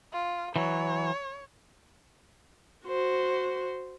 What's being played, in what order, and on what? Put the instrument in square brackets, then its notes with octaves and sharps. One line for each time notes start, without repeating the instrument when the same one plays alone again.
[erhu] F4
[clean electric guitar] E3 F#3 [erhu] C#5
[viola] F#4 C5